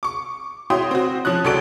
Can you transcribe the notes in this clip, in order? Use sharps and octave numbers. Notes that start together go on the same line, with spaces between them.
C#6 D6
E4 F#4 C#5 G5 C6 D#6
C4 F#4
F3 C#4 D#6 F#6
C#2 F#3 A4 D5 D7